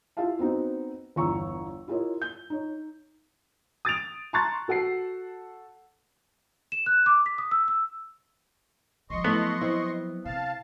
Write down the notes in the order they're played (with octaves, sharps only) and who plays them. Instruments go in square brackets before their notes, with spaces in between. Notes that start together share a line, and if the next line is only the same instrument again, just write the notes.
[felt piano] E4 F4 G4 E5 F5 A5
B3 C4 D#4 F#4
G1 E2 A#5 C#6 E6
E4 F4 G4 A#4 C#5 D#5
G6
D#4 C#5
[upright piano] D#6 A6 D7 F7
A5 A#5 C6 C#6 F#6 A6
F#4 A4 F#5 A5 C7
[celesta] E7
F#6
D6
B6
D#6
E6
E6
[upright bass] F3 F#3 [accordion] D#5 C6 C#6
[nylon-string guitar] A3 E4 [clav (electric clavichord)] B3
[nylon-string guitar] C4 E4
[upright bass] C3 [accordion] F5 A5